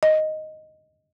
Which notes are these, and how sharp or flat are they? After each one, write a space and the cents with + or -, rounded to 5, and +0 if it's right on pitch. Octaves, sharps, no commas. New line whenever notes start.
D#5 +0